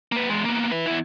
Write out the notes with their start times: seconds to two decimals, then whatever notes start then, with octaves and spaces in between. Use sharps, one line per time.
0.12 A#3 B4
0.29 E2 G#3
0.45 A#3 B3
0.72 E4 B4
0.86 E2 E4